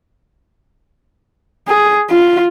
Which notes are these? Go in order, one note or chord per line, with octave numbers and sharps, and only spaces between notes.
G#4
F4